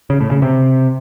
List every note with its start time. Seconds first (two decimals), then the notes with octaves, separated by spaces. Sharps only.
0.10 C#3
0.21 A2
0.31 C#3
0.42 C3